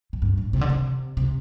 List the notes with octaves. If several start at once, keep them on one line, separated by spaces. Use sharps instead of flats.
A2
G2
A2
C3
D3
C3
C3